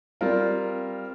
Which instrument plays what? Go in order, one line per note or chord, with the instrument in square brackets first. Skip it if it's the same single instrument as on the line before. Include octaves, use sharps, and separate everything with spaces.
[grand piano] G3 C4 F4 A#4